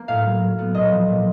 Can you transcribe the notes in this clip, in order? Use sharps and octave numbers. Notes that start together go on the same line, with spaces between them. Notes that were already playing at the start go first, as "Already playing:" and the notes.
Already playing: A#3
A2 F5
F#3
A2
B3
A#2 D#5
F3
A#2